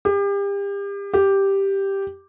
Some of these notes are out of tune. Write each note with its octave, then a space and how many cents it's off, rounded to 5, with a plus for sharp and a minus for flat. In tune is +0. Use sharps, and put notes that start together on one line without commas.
G4 +35
G4 +0